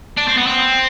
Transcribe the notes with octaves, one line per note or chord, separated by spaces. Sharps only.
D4
C4
B3
C4